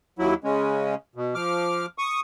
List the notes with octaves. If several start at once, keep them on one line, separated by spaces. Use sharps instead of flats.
D#2 F#3 E4
C#3 G#3 C#4
B2
F3 D6 F6
C#6 D#6